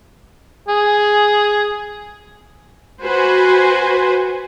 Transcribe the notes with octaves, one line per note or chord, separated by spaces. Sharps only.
G#4
F#4 B4 C5 G#5